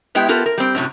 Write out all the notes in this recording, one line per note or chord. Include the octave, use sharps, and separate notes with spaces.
G#3 B3 E4 G4 G5
B3 F4 G4 A4 A#4
A#4
G3 C4
F#2 A2 C3 F#3